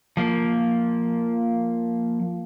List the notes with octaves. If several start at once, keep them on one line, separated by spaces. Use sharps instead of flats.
F3 A#3